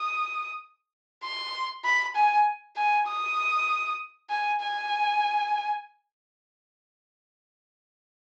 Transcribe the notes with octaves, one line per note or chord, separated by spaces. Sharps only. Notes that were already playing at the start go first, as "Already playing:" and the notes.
Already playing: D#6
C6
B5
G#5
G#5
D#6
G#5
G#5